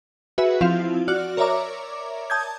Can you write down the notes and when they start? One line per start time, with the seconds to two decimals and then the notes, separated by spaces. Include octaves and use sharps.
0.38 F#4 G#4 B4 E5
0.61 F3 C4 E4 F4 F5
1.08 F#4 D5 F6 F#6
1.37 A#4 C#5 D5 E5 A#5 D6
2.30 A5 D#6 G6 G#6